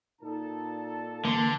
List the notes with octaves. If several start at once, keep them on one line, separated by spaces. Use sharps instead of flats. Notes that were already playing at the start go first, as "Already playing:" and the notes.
A#2 D#4 A4 A5
D3 E3 A#3 C6